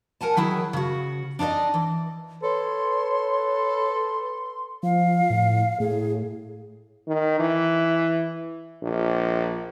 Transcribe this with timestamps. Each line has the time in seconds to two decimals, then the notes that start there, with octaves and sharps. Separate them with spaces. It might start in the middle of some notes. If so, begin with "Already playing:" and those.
0.21 A#4 F#5 G#5 A5
0.37 D#3 F#3 E4 G#4
0.73 C#3 F#4
1.39 D4 D#4 B4 D5 D#5
1.74 E3
2.43 A4 B4 C#5 C6
4.83 F3 F5
5.30 A2
5.80 A2 G#4
7.08 D#3
7.40 E3
8.83 A#1